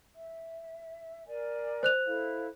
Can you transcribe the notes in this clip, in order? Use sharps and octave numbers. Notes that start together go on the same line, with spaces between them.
E5
A#4 D5 G#5
C5 F#6 F7
E4 A4 F5